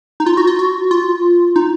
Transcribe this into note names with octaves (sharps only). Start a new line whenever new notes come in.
D#4
F4
F#4
F4
F#4
F4
D#4